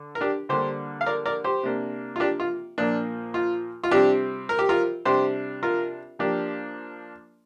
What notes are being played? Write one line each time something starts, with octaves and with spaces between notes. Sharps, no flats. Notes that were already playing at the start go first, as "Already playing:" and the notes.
Already playing: D3
A#4
D4 G4
D3 G3 A#3 D4 G4 C5
F5
A#4 D5
A#4 D5
G4 C5
C3 A#3 D4
F4
D4 G4
F4
A#2 F3 A#3 D4
F4
F4
C3 G3 C4 D4 G4
A#4
G4
F4 A#4
C3 G3 D4 G4 C5
F4 A#4
F3 A#3 D4 G4